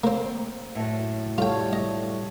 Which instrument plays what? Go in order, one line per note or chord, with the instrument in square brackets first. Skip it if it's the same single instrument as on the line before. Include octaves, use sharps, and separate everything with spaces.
[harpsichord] A#3 C5 [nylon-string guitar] C4
[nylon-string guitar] F#2 A2
[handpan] G3 A4 C#5 [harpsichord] F4 G5
[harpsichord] D#5